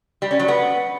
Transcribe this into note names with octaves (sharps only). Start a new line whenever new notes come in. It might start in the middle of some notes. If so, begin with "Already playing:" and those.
G3
C#4
F#3
B3